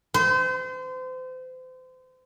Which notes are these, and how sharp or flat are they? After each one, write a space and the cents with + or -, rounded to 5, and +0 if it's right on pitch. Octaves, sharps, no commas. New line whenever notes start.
C5 -35